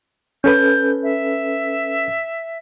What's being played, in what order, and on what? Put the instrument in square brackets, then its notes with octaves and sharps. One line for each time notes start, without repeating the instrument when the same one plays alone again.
[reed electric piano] C#4 A4 B4 [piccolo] G6
[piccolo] E5